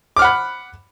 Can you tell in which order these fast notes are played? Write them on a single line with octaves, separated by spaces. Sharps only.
D6 F6 F#5 B5 F#6